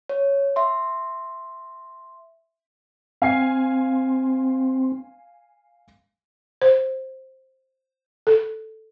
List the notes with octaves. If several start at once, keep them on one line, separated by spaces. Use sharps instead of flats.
C#5
E5 C6
C4 F5 G#5 C7
C5
A4